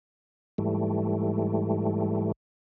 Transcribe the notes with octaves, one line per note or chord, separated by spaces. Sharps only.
G#2 E3 G3 A3